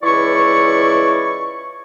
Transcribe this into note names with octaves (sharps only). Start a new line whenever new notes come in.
C#2 E3 E4 D5 C#6